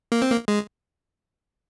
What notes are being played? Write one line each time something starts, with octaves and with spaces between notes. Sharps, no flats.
A#3
C4
A#3
G#3